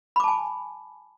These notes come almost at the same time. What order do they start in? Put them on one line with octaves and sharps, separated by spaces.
B5 D6 A5 G#5